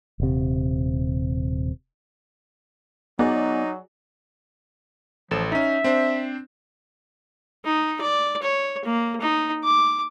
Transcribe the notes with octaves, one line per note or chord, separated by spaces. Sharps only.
D#1 C3
F#3 B3 D#4 F#4 G#4 D5
A1 F3 A4 E7
C#4 D#4 E5
C4 D4 C5
D#4
D5
C#5
A#3
D#4
D6